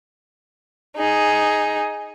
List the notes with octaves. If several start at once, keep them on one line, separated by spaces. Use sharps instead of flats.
D#4 G#4